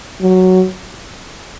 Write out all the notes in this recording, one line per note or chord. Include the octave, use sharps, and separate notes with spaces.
F#3